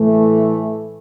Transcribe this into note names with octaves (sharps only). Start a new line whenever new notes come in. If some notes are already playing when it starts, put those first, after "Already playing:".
Already playing: A2 E3 A3